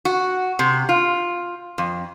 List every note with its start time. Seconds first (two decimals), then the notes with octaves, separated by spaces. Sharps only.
0.05 F#4
0.59 C3
0.89 F4
1.78 F2